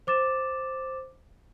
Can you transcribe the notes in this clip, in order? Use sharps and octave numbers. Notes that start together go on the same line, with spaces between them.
C5 D6 A6 E7